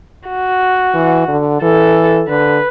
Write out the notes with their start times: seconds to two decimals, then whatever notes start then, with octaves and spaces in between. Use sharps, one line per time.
0.28 F#4
0.94 E3
1.28 D3
1.62 E3 A4
2.28 D3 B4